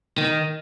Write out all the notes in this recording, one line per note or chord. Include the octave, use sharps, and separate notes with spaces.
D#3